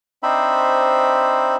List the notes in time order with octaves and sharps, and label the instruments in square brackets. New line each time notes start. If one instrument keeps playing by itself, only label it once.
[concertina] C4 D4 D#4 C5 E5 B5